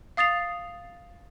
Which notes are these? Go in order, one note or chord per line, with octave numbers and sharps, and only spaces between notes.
F5 D#6 A6 C7 F7